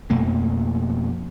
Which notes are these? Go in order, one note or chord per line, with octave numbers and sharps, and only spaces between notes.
F2 B2 A3 A#3